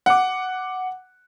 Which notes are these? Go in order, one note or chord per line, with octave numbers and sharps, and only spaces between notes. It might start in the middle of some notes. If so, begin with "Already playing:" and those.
F#5 D6